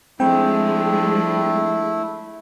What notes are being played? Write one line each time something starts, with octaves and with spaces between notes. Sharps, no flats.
F3 G#3 A3 C4 D4 E4 G5